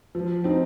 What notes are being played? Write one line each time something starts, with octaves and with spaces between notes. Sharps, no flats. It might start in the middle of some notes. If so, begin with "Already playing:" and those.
F3
C4 D#4